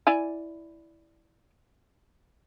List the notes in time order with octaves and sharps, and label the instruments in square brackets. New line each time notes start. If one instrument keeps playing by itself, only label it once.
[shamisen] E4 D5 G#5